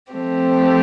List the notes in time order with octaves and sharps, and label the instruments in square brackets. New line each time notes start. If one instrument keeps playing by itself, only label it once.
[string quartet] F3 A3 C4 G4